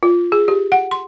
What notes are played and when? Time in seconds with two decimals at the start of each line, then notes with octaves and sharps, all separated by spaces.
0.03 F4
0.32 G#4
0.48 G4
0.72 F#5
0.91 C6